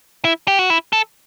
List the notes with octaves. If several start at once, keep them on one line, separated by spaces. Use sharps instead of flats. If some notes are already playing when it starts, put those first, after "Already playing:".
E4
G4
F#4
E4
A4